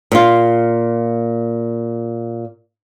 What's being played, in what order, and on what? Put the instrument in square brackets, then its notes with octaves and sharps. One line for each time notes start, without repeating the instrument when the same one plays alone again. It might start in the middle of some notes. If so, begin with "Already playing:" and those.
[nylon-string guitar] A#2 F4